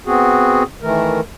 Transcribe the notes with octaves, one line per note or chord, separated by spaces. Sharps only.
B3 C4 F#4 G#4
D#3 E3 A3 A#4